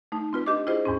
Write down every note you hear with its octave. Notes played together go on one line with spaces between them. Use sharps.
A3 D#4
C4 F4 B4
D4 G4 D#5 D6
E4 F4 G#4 C5 D#5
E2 G#2 C#4